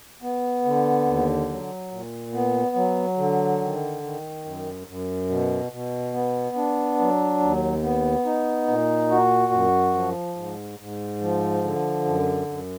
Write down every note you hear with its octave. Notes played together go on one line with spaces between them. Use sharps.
B3
D3
D#2
F#3
A#2
B3
F#3
D3
D#3
D#3
F#2
F#2
B2
B2
B3
D4
F#3
D#2
B3
D#4
A#2
F#4
F#2
F3
G#2
G#2
F3
D3
F#2
F#2